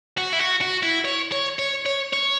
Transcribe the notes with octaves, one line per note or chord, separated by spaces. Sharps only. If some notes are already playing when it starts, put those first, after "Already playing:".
F#4
E4
F#4
F#4
E4
C#5
C#5
C#5
C#5
C#5